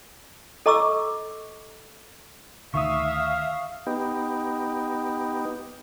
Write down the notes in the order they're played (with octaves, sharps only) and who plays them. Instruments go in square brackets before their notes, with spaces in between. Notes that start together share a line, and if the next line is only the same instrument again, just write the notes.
[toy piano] A4 D#5 A#5 C#6 D6 E6
[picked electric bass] D2 D#3 [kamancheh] E5 [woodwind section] F5 [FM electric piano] C#6 D#6
[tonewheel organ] B3 D#4 G4